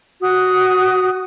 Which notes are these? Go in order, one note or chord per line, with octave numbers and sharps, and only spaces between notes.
F#4 D#6